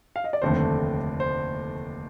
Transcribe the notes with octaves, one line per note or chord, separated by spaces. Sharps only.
F5
D#5
D5
F1 D#2 D3 A3 C5
C5